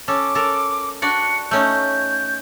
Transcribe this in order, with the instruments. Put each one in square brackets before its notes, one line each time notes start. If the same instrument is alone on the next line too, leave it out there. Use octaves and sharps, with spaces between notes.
[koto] C#4 A4 [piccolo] D6
[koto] A4 A#4
[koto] D4 F#4 D5 [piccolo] C#7
[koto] A3 C#4 D#4 [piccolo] G6